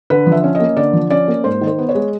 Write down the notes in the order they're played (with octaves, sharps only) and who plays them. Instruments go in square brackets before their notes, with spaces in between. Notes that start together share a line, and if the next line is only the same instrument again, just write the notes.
[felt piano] D3 B4
F3
E5
C#4
A#3 D#5
D3 D5
F3
C#4 D5
A#3
G#2 C5
D#3
C5
B3
C#5
G#3